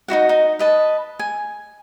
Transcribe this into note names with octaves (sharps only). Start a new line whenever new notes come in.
D#4 E4 F#4 F#5
D#4
B4 D#5 A5
G#5